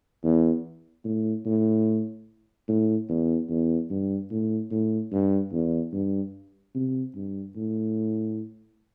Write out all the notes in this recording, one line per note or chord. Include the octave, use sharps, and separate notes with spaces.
E2
A2
A2
A2
E2
E2
G2
A2
A2
G2
E2
G2
C3
G2
A2